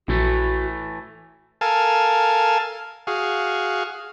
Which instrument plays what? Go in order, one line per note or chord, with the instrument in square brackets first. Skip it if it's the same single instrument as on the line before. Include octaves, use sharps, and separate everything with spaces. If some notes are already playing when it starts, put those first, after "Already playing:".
[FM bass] A#1 [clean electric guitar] A2 E3 A3 [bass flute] F#4
[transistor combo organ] A4 A#4 F5 G#5 A5
F#4 G#4 F5